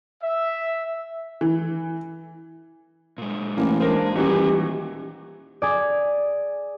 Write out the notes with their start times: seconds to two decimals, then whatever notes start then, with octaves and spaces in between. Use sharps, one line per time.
0.22 E5
1.41 E3
3.18 A#2 G#3
3.57 A1 A#3
3.80 G#3 A#3 D4 A#4 C5
4.15 D#1 E3 C#4 D#4 F#4 G4 C5
5.62 G#4 D5